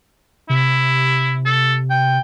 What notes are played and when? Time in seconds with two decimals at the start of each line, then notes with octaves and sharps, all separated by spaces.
0.49 C3 E4
1.45 A4
1.90 G5